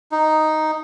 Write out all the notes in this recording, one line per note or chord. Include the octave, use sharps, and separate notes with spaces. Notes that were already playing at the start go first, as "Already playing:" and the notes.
D#4